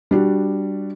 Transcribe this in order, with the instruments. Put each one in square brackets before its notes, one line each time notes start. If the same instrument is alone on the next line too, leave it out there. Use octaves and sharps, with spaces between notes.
[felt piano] G3 D4 F#4